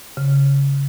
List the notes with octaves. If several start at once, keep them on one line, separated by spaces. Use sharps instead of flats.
C#3